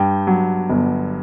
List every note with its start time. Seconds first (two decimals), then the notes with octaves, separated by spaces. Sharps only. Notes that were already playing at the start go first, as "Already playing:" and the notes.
Already playing: G2 G5
0.27 F#3
0.70 G1